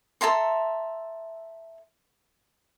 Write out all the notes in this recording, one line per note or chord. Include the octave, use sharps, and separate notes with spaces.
A4 E5 A#5 C6